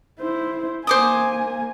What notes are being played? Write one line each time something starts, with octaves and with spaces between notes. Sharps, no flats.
E4 C5
A#3 C5 G#5 D6 D#6